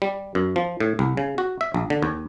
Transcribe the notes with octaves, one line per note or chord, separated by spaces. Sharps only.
G3
F#2
F3
A2
C2
C#3
F#4
E5
A#1
D3
D#2